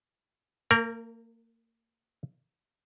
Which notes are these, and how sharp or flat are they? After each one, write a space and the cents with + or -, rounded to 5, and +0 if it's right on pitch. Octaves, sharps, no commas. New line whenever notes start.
A#3 -35 A#4 +0